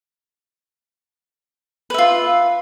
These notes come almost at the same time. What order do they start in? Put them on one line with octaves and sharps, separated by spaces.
B4 E5 F4